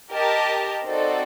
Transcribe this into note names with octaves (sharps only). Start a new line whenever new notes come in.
G4 A#4 D#5 A5
C4 D#4 F#4 A4 D5